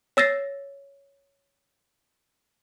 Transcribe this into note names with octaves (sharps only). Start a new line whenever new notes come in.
C#5 E6 A6 A#6 C7